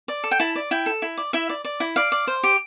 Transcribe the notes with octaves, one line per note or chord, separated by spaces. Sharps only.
D5
A4
G5
E4 A5
D5
E4 G5
A4
E4
D5
E4 E5
D5
D5
E4
D5 F5
D5
C5
G4